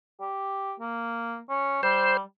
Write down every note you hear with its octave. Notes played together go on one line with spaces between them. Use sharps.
G4
A#3
C#4
G3 C5